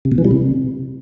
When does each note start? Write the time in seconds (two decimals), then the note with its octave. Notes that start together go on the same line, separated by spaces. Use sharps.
0.05 C3
0.12 B2
0.18 E3
0.25 G3
0.31 C3